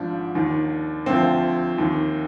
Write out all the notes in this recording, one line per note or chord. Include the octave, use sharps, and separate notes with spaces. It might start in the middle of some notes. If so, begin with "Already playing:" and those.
Already playing: G#1 G#2 F3 D4
D#2 D#3
D2 D3 F3 C4
D#2 D#3